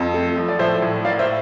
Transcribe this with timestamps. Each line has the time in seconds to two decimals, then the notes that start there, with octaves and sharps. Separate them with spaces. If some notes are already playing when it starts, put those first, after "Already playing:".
Already playing: F2
0.14 A3
0.37 F3
0.48 D5
0.59 A2 C5 E5
0.82 A2
1.04 A#3 D5 F5
1.19 C5 E5